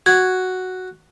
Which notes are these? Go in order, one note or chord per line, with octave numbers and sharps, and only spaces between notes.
F#4 G#6